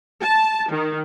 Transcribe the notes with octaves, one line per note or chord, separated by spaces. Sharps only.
A5
D#3